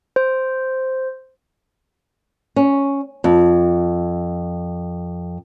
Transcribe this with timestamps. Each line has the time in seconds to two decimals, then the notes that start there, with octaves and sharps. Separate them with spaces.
0.16 C5
2.56 C#4
3.24 F2